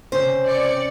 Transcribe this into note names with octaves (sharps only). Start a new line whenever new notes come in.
C3 C#4 C5
C4 D5 C#7